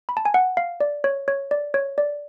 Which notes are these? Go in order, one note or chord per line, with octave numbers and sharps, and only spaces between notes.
B5
A5
G#5
F#5
F5
D5
C#5
C#5
D5
C#5
D5